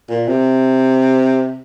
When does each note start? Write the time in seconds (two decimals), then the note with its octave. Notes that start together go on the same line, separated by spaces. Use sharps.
0.10 A#2
0.28 C3